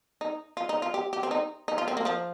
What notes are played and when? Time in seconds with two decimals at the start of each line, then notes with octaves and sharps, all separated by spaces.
0.21 D#4
0.57 F4
0.69 D#4
0.82 F4
0.94 G4
1.13 G4
1.23 C4
1.31 D#4
1.68 D#4
1.78 F4
1.88 C4
1.97 A#3
2.05 F3